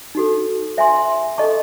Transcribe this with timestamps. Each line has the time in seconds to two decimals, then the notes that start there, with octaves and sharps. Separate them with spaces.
0.15 D#4 F#4 A4
0.77 C5 E5 G#5 C6
1.38 A4 D#5 A5 C#6